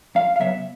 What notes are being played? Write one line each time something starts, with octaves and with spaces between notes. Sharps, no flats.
F2 F5
F5
C#3 F#3 B3 E5